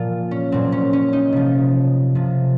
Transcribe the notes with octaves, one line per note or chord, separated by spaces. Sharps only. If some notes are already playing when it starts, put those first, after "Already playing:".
Already playing: A#2 F3 F4
C#4
A#2 F#3 C4
C#4
C#4
D#4
C3 F3
C3 F3